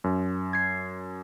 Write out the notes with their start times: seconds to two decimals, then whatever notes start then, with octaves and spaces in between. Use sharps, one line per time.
0.04 F#2
0.53 G#6 C7